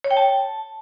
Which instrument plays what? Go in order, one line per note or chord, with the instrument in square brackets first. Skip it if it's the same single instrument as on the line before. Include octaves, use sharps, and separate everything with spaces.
[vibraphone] C#5
G5
A5